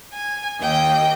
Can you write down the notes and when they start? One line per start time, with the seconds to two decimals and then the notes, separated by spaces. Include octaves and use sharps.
0.13 G#5
0.59 D#2 D#5 G5